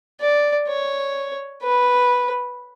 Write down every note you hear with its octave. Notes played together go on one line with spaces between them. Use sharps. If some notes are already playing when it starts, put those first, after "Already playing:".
D5
C#5
B4